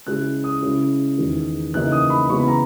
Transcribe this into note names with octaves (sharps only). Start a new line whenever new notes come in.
C#3 G#3 C#4 E4 F#6
D#6
C#3 G#3 C#4 E4
E2 D#3 G#3
C#3 E3 A#3 D#4 F#6
D#6
B5
C#3 E3 G#3 B3 E4 C#6
B5
A#5